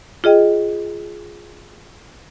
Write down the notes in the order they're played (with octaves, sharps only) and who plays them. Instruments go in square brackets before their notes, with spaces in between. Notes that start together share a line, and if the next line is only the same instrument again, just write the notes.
[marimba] F4 G#4 D#5 G5